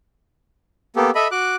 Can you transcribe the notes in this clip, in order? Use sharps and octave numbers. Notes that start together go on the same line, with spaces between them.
A#3 B3 G4 A4
A4 D#5 E5 B5
F#4 D6 F#6